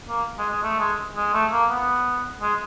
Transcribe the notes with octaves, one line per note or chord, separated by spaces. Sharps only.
A#3
G#3
G#3
A3
G#3
G#3
A3
A#3
B3
G#3